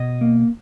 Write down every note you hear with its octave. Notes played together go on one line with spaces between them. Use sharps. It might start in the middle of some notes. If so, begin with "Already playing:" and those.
Already playing: B2 D#5
A#3